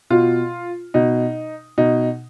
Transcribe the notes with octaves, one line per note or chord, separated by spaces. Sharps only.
B2 F4
B2 D#4
B2 D#4